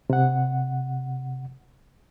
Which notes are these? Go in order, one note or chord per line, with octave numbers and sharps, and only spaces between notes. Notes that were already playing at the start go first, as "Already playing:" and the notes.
C3 F#5